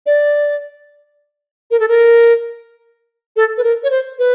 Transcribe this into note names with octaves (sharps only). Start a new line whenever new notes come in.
D5
A#4
A4
A#4
A4
B4
A#4
C#5
C5
B4